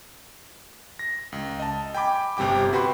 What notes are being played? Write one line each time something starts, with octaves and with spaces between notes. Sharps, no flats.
A#6
C#2
D#5 A5
G5 G#5 B5 D6
G1 C3 G3 G5 D6
F#4 B4 G5 B5 C6